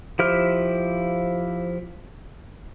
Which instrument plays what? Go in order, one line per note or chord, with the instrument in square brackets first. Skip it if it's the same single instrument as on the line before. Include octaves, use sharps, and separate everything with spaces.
[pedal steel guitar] F3 E4 G4 C5 F6